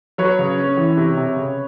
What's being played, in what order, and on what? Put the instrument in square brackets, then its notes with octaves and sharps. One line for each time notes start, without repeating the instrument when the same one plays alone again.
[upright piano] F#3 B4 C#5
C#3
C#4
E3
C3
C3
C#3